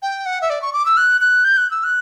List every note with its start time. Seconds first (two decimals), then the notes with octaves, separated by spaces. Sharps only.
0.03 G5
0.26 F#5
0.42 E5
0.50 D5
0.62 C#6
0.73 D6
0.86 E6
0.97 F#6
1.21 F#6
1.44 G6
1.57 F#6
1.71 E6
1.84 F#6